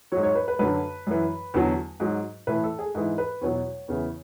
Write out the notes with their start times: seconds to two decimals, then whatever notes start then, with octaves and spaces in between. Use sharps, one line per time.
0.12 G#2 F#3 C#5
0.23 C#5
0.35 B4
0.48 B4
0.59 F#2 D3 F#3 B4
1.07 F#2 E3
1.54 E2 D3 F#3
2.00 G#2 F#3
2.47 A2 E3 B4
2.64 A4
2.79 G#4
2.95 G#2 E3 G#4
3.18 B4
3.41 E2 B2 F#3 C#5
3.88 E2 C#3 E3